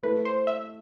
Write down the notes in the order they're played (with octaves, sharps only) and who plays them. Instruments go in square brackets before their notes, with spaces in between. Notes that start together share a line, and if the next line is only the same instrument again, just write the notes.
[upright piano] A3 E4 A4 [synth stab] B4
[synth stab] C5
E5